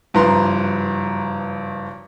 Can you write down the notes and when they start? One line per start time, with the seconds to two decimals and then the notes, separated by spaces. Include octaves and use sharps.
0.14 F#1 G2 F3 B4 A#5 C6